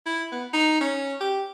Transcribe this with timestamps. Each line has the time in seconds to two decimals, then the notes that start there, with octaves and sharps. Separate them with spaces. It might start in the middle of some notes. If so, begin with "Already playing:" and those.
0.06 E4
0.32 B3
0.53 D#4
0.81 C#4
1.21 G4